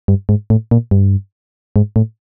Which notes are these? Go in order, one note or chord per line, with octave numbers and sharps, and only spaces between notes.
G2
G#2
A2
A#2
G2
G#2
A2